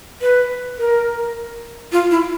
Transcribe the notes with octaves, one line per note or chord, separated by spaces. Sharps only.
B4
A#4
F4
E4